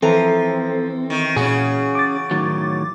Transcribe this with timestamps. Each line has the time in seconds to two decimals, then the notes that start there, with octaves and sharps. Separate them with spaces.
0.02 E3 F3 C4 A4 A#5
1.10 D#3
1.36 A#2 C#3 C#4 F#4 G#4
1.95 D6 A6
2.31 A2 D#3 F#3